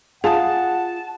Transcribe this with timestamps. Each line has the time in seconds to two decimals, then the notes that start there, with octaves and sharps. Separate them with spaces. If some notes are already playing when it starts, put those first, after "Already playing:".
0.24 F4 G#4 F#5 A5